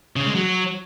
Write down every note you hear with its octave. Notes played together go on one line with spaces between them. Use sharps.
C#3
G#3
F#3